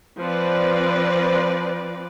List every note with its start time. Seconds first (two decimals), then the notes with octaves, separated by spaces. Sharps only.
0.21 F3 C4 B4 D5